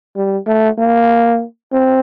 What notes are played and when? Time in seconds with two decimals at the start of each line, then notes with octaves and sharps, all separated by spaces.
0.16 G3
0.47 A3
0.78 A#3
1.72 C4